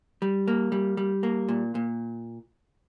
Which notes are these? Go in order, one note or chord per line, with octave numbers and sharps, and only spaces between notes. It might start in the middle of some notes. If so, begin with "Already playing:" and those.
G3
A#3
G3
G3
A#3
A#2
A#2